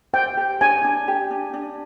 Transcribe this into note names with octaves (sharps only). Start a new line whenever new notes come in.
C5 G5
G4
D4 G#5
D4
G4
D4
D4